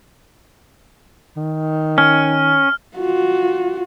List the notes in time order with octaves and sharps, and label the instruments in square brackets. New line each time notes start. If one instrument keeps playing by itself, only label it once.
[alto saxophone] D#3
[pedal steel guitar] C#4 [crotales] F6
[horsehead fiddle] F4 F#4